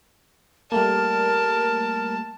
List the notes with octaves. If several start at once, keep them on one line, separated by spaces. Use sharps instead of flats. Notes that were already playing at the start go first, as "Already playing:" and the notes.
G3 A3 A#3 A#4 A5